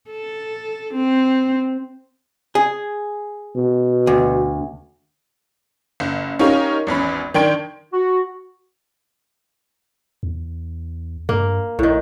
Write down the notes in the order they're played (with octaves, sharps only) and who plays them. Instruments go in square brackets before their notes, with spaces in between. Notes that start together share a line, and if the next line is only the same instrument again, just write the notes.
[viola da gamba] A4
C4
[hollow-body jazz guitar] G#4
[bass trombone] B2
[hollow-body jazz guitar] D2
[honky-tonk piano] F#1
C#4 D#4 F4 G4 A#4 C#5
G#1 E2 C#4 B5
D#3 D4 G5 C6 G#6 D7
[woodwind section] F#4
[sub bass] E2
[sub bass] G2 [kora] A#3
[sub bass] A#1 [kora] A2 D#3